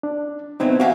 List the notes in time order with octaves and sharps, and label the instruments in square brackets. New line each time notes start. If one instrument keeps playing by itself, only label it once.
[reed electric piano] D4
[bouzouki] A2 E3 F#3 [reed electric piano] B3 C4 D#4
[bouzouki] A#3 G4 F5 [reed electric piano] F#4 F#5 G#5